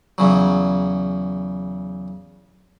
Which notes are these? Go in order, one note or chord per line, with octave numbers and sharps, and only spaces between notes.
E2 C#3 F#3